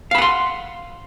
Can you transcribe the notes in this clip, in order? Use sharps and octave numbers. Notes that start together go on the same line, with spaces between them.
F5 F#5 B5 C6